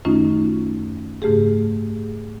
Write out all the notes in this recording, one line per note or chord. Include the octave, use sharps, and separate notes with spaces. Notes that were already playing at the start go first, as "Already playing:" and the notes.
F#2 D#3 A3 C#4 D#4 F4
G#2 C#3 A3 G4 G#4